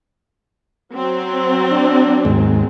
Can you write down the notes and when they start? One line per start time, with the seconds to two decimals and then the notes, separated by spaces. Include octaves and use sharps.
0.94 F#3 C4
1.72 D4
2.25 D#2 G#2 G#3